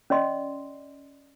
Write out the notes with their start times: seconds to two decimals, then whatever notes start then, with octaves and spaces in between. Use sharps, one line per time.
0.10 C#4 D5 D#5 C6